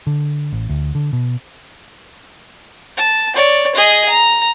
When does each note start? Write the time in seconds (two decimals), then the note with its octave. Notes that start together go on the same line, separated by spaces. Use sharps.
0.07 D3
0.53 A1
0.69 D2
0.95 D3
1.13 B2
2.97 A5
3.35 C#5 D5
3.75 G#4 D#5
4.09 A#5